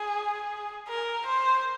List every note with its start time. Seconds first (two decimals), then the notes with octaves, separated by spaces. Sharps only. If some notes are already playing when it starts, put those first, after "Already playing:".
Already playing: G#4
0.88 A#4
1.26 C5